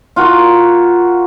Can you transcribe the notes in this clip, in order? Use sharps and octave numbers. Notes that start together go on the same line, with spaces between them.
F4 F#4 A#4